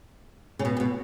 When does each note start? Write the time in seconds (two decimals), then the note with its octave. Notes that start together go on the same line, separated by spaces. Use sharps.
0.59 C#3
0.65 B2
0.77 C#3
0.80 B2